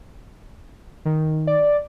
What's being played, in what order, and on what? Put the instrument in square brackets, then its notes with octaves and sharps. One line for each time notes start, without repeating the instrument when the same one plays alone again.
[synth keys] D#3
[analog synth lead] D5